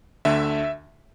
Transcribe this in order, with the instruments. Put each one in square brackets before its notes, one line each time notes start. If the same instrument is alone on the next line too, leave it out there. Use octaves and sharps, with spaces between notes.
[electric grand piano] D2 D3 A3 E5